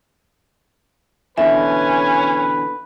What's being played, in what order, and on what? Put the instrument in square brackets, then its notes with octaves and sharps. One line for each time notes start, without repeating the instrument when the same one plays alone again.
[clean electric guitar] B2 D3 E3 [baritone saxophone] C#4 [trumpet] B4 [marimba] E5